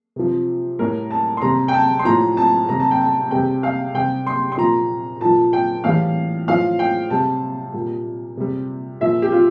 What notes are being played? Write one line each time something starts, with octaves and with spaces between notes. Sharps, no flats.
C3 F3
A2 G3 A#4
A5
C6
C3 G3 A#5
G5
A5
C6
A2 F3 A#5
A5
C3 G3 A#5
A5
G5
A5
C3 G3 G5
F5
C3 G3 G5
C6
C6
A#2 F3 A#5
A#2 F3 A5
G5
A2 E3 G3 F5
A2 F3 F5
G5
C3 G3 A5
A#2 G3
C3 G3
A#2 F3 E5
G4
F4